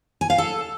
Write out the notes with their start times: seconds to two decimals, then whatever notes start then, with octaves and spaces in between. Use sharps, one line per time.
0.21 G#5
0.30 F5
0.38 A4